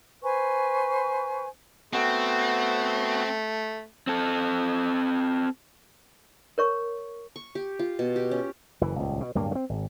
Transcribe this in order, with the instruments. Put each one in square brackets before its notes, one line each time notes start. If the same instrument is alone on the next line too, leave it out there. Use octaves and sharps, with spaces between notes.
[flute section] B4 C5 G#5 C#6
[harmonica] A3 [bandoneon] B3 F#4 [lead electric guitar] C4
[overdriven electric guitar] C4 A4
[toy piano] A#4 C#5 C#6
[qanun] C#6
G4
F4
B2
G4
C#4
[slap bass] F#1 E3
D#1 C#2
B2
D1 G2 A#3
A3 C4
G#1